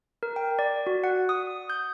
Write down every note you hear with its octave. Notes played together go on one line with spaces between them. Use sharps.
A#4
G5
D5
F#4
F#5
D#6
G6